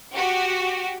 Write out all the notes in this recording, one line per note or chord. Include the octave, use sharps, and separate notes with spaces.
F#4 G4